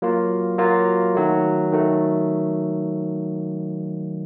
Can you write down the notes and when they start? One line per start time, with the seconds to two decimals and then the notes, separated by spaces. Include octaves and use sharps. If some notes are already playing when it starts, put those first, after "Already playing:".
0.02 F#3 A#3 F4
0.58 F#3 A#3 F4
1.15 D#3 F#3 A3
1.72 D#3 F#3 A3